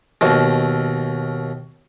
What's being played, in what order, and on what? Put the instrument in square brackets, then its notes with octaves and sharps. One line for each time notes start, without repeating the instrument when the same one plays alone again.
[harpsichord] D#2 B2